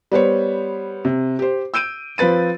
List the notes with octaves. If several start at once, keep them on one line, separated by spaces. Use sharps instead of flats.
G3 B3 C5 C#5
C3
G4 C5
E6 G6 D7 D#7
F3 C4 B4 A6 D#7